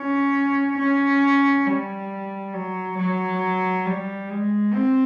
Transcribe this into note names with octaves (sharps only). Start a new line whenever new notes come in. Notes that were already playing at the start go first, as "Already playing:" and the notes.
Already playing: C#4
C#4
G3
F#3
F#3
G3
G#3
C4